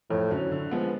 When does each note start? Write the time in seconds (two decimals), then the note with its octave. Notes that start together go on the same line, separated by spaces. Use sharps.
0.10 F2 A2
0.30 D3 F#3 C#4
0.52 D3
0.71 F3 G#3 B3